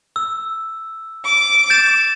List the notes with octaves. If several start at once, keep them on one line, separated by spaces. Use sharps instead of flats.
E6
D6
G6 A6 E7